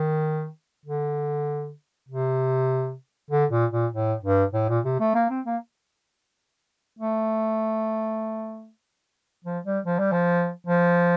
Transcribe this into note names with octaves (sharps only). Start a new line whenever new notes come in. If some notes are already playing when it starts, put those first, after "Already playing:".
Already playing: D#3
D3
C3
D3
A#2
A#2
A2
G2
A2
A#2
C3
A3
A#3
C4
A#3
A3
F3
G3
F3
G3
F3
F3